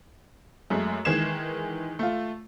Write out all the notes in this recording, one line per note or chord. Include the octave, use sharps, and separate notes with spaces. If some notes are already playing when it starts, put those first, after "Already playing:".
F#2 G#3 A3
D#3 E3 G#3 G#6 C7 E7
A3 F4